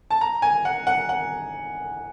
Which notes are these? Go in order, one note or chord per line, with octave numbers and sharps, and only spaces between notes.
A5
A#5
G#5
F#5
F#5
F#5